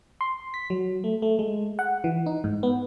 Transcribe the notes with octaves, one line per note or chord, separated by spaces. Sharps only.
C6
B6
F#3
A3
A3
G#3
F#5
E3
D#4
G#2
B3